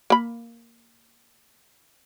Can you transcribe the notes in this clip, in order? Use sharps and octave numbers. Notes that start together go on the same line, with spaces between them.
A#3 B5